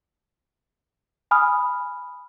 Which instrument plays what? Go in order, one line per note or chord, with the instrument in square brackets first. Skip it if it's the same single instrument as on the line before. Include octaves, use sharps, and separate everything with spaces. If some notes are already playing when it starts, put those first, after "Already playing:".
[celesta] G#5 B5 D#6 F6